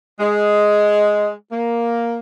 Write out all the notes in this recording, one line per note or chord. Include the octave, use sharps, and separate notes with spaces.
G#3
A#3